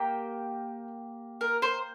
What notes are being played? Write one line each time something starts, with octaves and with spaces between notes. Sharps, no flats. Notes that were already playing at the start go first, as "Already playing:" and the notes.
Already playing: A#3 G4 G5
A#4
C5